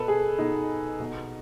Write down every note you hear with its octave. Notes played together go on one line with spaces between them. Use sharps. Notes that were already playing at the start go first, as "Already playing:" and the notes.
Already playing: B2 A4 B4
G#4
B2 D#4
B2